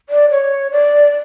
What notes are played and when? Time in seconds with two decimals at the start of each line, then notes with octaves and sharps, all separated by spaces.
0.09 D5
0.30 C#5
0.71 D5